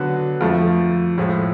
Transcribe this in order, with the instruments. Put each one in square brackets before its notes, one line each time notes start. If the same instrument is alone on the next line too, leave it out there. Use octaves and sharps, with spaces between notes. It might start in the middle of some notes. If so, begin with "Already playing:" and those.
Already playing: [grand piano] D3 F#3 B3 F#4 B4
F2 F3 A3
A2 F3 G#3